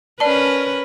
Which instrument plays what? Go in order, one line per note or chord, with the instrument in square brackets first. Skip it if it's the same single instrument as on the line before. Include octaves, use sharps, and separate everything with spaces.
[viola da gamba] C#4 A#4 B4 [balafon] D5 A5